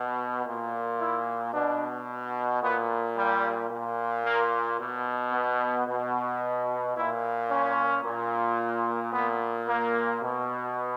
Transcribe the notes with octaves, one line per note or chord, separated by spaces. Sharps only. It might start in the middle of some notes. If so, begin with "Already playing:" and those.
Already playing: B2
A#2
E4
B2 D4
A#2 B3
G3
A#2
A#3
B2
B3
B2
A#2 E4
C#4
A#2
A#2 B3
A#3
B2